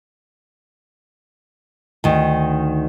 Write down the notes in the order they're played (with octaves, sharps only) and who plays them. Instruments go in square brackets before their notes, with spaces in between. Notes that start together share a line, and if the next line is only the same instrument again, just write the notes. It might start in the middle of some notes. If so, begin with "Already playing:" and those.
[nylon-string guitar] D2 D#3